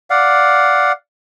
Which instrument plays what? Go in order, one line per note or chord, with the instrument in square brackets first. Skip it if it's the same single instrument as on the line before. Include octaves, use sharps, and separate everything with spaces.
[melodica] D5 F5 F#5